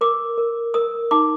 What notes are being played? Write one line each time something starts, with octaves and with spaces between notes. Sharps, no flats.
A#4 D6
A#4
A#4 D#6
D#4 D6